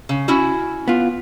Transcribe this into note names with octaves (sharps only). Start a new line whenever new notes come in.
C#3
C#4 E4 F#4
B3 F4